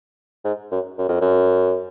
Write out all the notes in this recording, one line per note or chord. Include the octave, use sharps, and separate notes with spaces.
G#2
F#2
F#2
F2
F#2